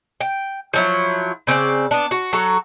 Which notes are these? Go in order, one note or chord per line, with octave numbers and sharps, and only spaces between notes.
G5
F3 F#3 E4
C#3 C4 B4 D5
B3 D4
F#4
F#3 F#4 A4